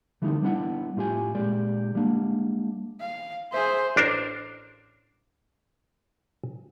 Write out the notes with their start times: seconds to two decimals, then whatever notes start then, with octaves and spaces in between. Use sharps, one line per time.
0.22 D3 E3 G3 A3 C#4 D#4
0.42 G3 B3 D4 E4 D5 F#5
0.97 A2 F4 G4 G#5
1.35 A#2 G#3 G4 D5
1.95 G3 G#3 A#3 D4
3.00 F5
3.53 G#4 C5 E5
3.96 A1 D4 A#4 C5